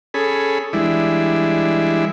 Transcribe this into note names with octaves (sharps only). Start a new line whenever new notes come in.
C#4 G#4 A4 B5
E3 G3 G#3 D4 E4